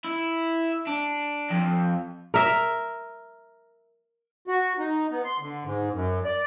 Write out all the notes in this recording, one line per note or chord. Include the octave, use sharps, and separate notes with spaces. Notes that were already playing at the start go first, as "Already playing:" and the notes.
E4
D4
F2
A#4 E5
F#4
D#4
B3
C6
D3
G#2
F#2
D5